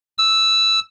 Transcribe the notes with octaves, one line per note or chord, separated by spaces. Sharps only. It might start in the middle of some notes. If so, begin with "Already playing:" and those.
E6